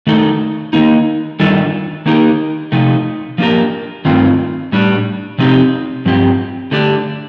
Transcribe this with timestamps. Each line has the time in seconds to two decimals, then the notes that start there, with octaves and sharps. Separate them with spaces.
0.07 D#3 A3 D#4 A4
0.73 D#3 A#3 D#4
1.40 D#3 G3 D4 F4 A4
2.06 D#3 A#3 D#4 G4 A#4
2.72 C3 F3 A3 D#4
3.38 F3 A#3 D4 G4 A#4
4.05 G2 D#3 A3 C4 F4
4.72 A2 G3 D4
5.38 C3 F3 C4 D#4 G4
6.05 G2 F3 C4 G4
6.71 D3 A3 D4 G4